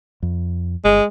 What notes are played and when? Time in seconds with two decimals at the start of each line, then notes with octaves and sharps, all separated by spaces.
0.23 F2
0.85 G1 G#3